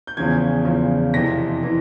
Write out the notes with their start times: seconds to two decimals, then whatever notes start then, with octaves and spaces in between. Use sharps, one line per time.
0.07 G6
0.17 E2 C#3 F3 G#6
0.65 E2 C#3 F3
1.13 F2 C3 E3 A#6
1.63 C3 E3